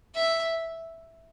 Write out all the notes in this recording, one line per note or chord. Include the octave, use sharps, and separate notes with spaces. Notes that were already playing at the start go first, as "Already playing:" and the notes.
E5